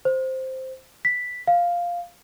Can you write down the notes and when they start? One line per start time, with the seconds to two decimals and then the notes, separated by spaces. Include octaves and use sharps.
0.05 C5
1.05 B6
1.48 F5